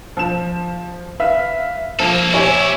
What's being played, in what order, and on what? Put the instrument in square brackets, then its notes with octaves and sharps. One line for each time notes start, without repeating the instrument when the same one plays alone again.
[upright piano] F3 E7
B4 E5 F5
[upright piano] F3 [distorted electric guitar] A#3 A4
[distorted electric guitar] A#2 E4 [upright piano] G4 C#5 G#5